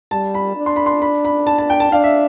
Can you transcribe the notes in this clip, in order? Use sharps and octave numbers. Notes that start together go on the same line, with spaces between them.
G3 A5
B5
D4
C6
B5
C6
B5
B5
A5
A5
G5
A5
D4 F5
E5